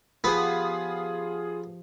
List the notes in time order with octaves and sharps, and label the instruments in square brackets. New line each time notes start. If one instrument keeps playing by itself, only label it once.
[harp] F3 G4 G6 [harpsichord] B3 [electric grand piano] F4 G#4